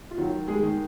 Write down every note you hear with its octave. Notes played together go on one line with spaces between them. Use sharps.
F4
D#3 F#3 F#4
G#3 G#4
D#3